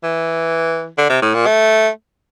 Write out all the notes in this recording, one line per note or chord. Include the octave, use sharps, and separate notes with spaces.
E3
D3
C3
A2
A#2
A3